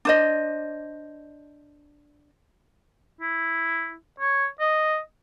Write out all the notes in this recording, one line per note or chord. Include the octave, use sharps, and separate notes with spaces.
D4 C5 D#5
E4
C#5
D#5